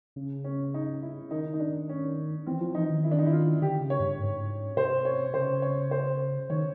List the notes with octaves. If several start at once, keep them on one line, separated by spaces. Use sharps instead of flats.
C#3
C#4
D#4
E4
D#3 D#4
D#4
D4
C#4
E3 C4
F3
E3 D#4
D#3
E4
D4
D#4
E4
F4
D3 G4
C#3
C#5
G2
G#2
C3 C5
C#5
C#3 C5
C#5
C5
D#3 C#5